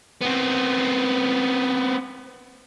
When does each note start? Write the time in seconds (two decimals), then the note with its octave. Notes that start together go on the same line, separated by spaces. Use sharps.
0.21 B3 C4